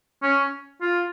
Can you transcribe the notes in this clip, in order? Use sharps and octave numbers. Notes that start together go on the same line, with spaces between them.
C#4
F4